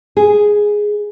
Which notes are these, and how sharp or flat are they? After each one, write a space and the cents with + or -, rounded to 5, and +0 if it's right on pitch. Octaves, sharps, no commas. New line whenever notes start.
G#4 +0